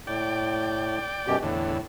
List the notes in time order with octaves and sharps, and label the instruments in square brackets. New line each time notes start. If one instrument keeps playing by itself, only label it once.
[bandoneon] A2 [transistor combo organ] D5 G5
[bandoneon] F#2 B2 G4
[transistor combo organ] E2 D3 [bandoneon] A2